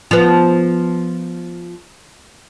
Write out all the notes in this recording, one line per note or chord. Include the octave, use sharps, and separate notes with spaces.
F3 B3